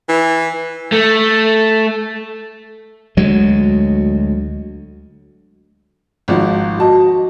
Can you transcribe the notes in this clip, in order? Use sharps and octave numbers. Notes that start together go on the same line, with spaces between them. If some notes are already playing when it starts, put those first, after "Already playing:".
E3
A3
D2 F#3 G#3
G#1 F3 F#4
F#4 D#5 A5